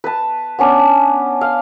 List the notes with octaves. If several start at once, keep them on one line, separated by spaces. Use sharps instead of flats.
B4 A5
B3 C#4 D4
F5